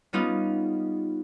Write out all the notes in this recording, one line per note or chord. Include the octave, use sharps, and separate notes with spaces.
G3 B3 C#4 D#4 F4